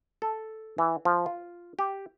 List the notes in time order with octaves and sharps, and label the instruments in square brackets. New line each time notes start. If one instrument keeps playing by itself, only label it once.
[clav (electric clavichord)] A4
E3
F3
F4
G4